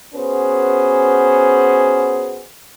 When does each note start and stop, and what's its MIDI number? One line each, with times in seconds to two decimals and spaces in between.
0.15 2.43 59
0.15 2.43 61
0.15 2.43 66
0.15 2.43 68
0.15 2.43 71
0.15 2.43 72